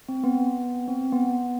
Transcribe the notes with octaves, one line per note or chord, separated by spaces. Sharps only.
C4
B3
C4
B3